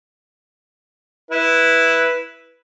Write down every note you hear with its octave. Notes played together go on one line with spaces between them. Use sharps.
E4 B4